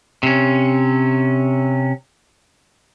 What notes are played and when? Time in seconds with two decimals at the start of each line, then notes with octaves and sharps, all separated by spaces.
0.23 C3 C#4